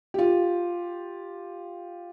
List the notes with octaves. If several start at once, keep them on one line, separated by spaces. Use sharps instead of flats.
F4 G4